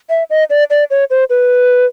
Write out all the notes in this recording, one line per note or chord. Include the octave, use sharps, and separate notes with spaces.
E5
D#5
D5
D5
C#5
C5
B4